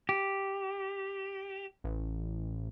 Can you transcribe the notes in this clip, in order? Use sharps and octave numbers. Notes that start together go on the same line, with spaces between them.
G4
A1